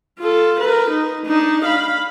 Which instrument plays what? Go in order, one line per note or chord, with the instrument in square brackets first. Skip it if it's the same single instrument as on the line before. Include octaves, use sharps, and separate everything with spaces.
[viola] F4 A4
A#4 B4
D#4
D4 D#4
F5 B5